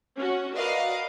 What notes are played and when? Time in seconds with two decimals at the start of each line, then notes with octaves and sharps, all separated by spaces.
0.17 C#4 F#4
0.54 F#4 A#4 B4 D5 D#5 F5